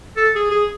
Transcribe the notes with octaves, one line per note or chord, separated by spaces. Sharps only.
A4
G#4
G#4